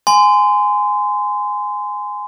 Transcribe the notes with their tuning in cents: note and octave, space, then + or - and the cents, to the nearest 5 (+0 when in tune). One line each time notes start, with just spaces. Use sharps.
G#5 +0 C6 -25